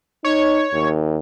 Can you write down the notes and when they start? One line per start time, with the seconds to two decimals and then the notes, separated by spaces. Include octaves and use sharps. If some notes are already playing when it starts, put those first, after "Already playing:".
0.24 D#4 C#5
0.73 D#2